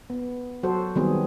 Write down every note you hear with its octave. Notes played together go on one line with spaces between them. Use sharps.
B3
F#3 F#4 A4 C5
D#3 F#3 G3 B3 C4 G#4